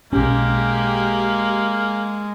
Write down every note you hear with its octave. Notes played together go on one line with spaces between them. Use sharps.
B1 G#3 A#3 C#4 G4